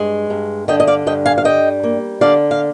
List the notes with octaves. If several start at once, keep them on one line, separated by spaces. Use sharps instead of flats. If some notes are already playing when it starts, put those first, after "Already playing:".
Already playing: G2 G#3
G2
D3 D#5 G5
D#5
D5 F5
G2 D#5 G5
F5 G#5
F5
G3 D#5 G5
A#3
D3 D5 F5
F5